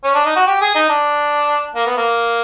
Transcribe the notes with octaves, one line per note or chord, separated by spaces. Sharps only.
C#4
D4
D#4
F#4
G4
G#4
D#4
D4
A#3
B3
A#3